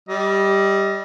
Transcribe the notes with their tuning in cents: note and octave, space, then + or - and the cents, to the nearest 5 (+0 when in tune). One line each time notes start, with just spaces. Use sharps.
G3 +0 D#5 +20